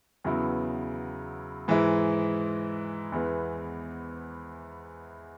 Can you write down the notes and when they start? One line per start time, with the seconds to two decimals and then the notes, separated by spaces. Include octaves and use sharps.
0.24 E2 C#3 F#3 B3 E4
1.68 G#2 E3 G#3 E4
3.12 E2 E3 G#3 B3